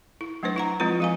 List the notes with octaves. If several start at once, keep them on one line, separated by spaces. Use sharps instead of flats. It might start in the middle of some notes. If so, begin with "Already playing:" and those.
E4
F#3 A3 D4 B4 C5
E4 F#5 A#5
F3 G#3 C4 E4 F4 B4
F3 F5 G#5